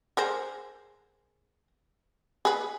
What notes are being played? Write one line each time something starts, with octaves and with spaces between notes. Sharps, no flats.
G#4 A#4 C5
G#4 B4